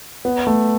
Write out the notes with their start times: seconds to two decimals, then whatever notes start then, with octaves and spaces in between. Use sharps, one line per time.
0.25 B3
0.47 A3